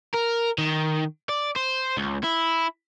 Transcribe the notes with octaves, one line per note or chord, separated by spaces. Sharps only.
A#4
D#3
D5
C5
C#2
E4